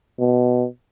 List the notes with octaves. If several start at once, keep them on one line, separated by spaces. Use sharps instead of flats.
B2